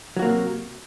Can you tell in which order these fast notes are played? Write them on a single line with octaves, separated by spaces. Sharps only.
F#3 F#4 A#3 C3